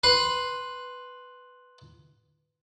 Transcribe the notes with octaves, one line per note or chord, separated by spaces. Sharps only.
B4 C6